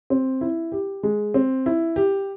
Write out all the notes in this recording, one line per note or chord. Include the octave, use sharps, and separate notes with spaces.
C4
E4
G4
G#3
C4
E4
G4